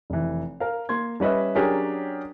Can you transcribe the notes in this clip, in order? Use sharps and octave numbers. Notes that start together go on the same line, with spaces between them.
F1 E3
A#4 F5
A#3 C6 G#6
G3 C#4 B4 D#5 E5
F#3 C#4 D4 G4 G#4 A#4